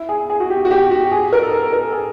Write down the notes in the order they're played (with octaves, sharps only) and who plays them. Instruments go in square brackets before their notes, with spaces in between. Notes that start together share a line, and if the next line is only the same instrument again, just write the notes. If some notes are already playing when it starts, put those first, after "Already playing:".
Already playing: [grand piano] E4
G#4
G#4
F#4
G4
F#4
G4
F#4
G#4
A#4
A4
A#4
G#4